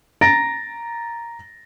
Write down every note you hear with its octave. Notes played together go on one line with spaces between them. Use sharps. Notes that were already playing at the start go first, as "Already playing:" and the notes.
A#5 A6 A#6 D7